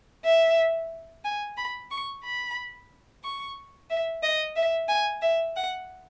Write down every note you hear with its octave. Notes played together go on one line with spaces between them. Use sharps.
E5
G#5
B5
C#6
B5
C#6
E5
D#5
E5
G#5
E5
F#5